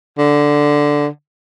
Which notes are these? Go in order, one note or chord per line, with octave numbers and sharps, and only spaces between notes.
D3